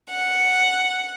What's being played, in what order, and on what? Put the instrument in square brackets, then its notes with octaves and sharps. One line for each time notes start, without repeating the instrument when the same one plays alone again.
[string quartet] F#5